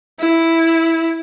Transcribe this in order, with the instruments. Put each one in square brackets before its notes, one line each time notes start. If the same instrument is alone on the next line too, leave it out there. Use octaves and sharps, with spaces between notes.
[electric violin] E4